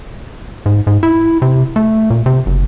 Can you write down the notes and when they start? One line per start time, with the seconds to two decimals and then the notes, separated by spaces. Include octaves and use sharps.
0.66 G#2
0.87 G#2
1.03 E4
1.42 C3
1.76 A3
2.10 A#2
2.26 C3
2.46 F#1